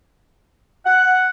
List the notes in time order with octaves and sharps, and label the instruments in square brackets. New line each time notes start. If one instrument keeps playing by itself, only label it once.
[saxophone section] F#5